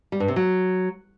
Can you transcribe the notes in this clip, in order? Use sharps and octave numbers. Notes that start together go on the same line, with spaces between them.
G3
G2
C3
F#3